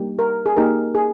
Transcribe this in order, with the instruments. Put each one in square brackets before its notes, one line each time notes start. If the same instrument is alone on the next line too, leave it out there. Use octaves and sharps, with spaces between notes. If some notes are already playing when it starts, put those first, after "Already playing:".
Already playing: [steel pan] G3 A#3 D#4 G4
A#4
G#4
A#3 D#4 G4 A#4
G#4